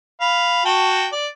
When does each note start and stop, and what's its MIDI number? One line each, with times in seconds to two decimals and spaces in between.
0.21 0.65 77
0.21 0.65 83
0.65 1.07 66
0.65 1.07 79
0.65 1.07 81
1.13 1.27 74